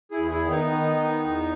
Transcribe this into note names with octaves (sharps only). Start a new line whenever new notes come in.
E4 G#4
E2
E4 G#4
D#3
B3 D#4
D#3
D#3
E2